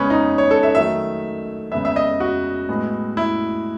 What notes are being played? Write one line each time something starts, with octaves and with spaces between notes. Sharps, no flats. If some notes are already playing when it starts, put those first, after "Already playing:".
Already playing: C#3 G#3 B3 C#4 B4
D#4
C#5
A4
E5
D#3 F#3 A3 E5
C#3 G#3 B3 E5
E5
D#5
F#4
A2 G#3 B3
E4